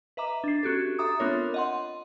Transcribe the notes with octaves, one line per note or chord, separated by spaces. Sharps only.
B4 D#5 E5 A#5 D6
D4 C7
C#4 F#4 G4 A4
A4 E5 A#5 D6 D#6
B3 C4 D4 F4 A#4 C#5
D#5 F#5 C6